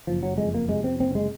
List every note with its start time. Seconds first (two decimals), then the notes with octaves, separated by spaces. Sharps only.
0.07 F#1 F3
0.23 F#3
0.38 F2 G#3
0.54 A#3
0.69 C3 G#3
0.84 C4
1.00 F#1 C4
1.15 G#3